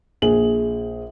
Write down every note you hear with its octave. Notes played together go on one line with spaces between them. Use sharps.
A#1 G#4 F#7